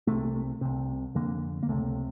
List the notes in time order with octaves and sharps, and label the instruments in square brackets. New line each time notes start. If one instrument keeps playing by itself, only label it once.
[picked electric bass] C2 C3 A3
C2 C3
F2 D3 A#3
A#3
C#2 C3 A3